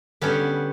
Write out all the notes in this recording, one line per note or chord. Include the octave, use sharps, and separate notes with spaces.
D3 G3 B3 C#4